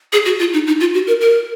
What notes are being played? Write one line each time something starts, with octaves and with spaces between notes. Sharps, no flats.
G#4
F#4
F4
D#4
D#4
F4
F#4
A#4
A#4